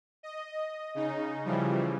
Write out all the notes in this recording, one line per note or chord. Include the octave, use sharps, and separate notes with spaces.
D#5
C#3 D#4
C#3 E3 F3 G3